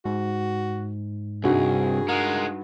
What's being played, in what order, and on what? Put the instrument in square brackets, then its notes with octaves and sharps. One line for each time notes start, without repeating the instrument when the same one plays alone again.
[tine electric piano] G#2 [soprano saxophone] F#4
[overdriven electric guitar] C2 [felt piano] G2 D#4 F#4 [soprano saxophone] G#4
[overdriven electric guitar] G#3 F4 [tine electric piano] A#4 [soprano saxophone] F#5